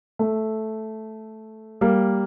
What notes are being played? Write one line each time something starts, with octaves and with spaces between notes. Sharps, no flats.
A3
G3 A#3